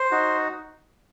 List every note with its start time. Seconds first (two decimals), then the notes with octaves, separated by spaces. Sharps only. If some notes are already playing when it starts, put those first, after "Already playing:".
Already playing: C5
0.11 D#4 F#4